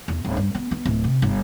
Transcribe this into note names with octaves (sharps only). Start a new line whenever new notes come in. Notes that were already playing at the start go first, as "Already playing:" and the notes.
E2
D1
G2
B3
B3
D1
C3
G1